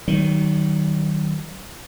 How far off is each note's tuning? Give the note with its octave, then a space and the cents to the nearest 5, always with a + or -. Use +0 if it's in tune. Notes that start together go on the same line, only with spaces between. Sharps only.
D#3 +0 F#3 +40